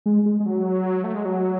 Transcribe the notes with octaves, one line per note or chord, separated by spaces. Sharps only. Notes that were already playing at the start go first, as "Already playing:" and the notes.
G#3
G#3
G#3
F#3
A3
G#3
F#3